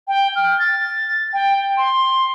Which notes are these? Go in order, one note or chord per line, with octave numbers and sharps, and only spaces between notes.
G5
F6
A6
G5
C6